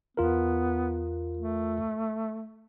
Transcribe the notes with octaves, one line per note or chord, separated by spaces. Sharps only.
E2 B3 F4 A#4
A3